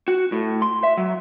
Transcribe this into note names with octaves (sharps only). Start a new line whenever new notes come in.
F#4
A2
C6
E5
F#3